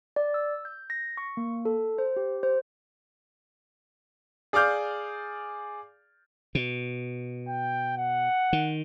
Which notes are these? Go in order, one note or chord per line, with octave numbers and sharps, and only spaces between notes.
D5
E6
G6
A#6
C#6
A#3
A4
C5
G4
C5
G#4 D5 F5 D6 F6 G6
B2
G5
F#5
D#3